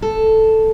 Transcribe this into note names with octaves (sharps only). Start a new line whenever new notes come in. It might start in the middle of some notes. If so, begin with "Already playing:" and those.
A4